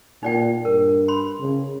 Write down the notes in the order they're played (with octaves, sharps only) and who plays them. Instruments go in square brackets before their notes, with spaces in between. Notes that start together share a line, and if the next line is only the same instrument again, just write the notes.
[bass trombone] A#2 [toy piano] D#4 D5 G5
[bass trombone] G2 [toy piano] A#4
[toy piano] B5 C6
[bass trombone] C#3